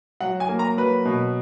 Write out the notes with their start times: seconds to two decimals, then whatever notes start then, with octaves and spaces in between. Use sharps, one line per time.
0.21 F#3 F#5
0.40 G#5
0.49 A#3
0.59 A#5
0.77 F#3 B4
1.05 B2